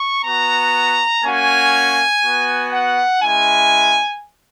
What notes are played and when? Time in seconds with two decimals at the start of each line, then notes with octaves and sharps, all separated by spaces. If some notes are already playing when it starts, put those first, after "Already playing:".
Already playing: C#6
0.24 B3 F#4 A#5
1.23 A#3 C#4 F#4 G#5
2.24 B3 F#4
2.73 F#5
3.22 G#3 C#4 E4 G#5